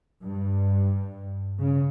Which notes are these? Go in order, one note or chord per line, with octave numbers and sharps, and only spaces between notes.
G2
C#3